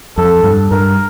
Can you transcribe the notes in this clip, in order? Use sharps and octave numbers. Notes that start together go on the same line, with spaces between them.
F2 A4
G2
G2 A#4